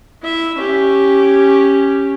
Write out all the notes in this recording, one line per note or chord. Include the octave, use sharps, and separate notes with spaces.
E4 E5
C#4 G4